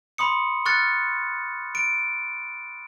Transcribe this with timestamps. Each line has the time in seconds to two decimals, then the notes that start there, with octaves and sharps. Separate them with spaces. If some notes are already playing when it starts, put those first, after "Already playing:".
0.18 B5 C6 D#6 C#7
0.66 C#6 F6 F#6 A6 C#7
1.75 D7